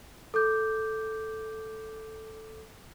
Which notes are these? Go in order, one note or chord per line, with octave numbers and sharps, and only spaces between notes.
A4 D6 G6